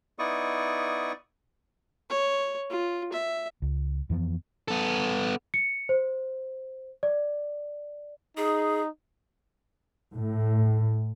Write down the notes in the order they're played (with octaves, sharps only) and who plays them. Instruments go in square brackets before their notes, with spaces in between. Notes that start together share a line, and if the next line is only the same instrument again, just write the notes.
[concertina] B3 D#4 E4 D5 C#6 D#6
[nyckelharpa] C#5
F4
E5
[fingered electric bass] C#2
F2 E3 F3 B3
[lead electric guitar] B3 A4
[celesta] C#7
C5
D5
[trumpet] D#4 [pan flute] G#4
[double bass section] A2